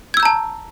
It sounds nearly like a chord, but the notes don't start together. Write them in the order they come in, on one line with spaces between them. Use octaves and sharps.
G#6 E6 G6 A#5 A5